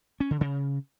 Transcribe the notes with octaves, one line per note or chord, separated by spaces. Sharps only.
C#4
D3
C#3